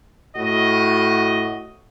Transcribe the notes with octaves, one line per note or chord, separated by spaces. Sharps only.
A2 F#4 D#5